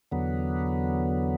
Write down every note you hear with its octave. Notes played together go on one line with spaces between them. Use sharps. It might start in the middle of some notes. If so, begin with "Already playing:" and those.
E2 D3 F#3 B3